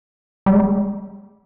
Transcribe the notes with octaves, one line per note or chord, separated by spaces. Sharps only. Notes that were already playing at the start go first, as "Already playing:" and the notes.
G3
G#3